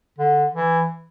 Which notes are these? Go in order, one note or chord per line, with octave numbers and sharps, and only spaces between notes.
D3
E3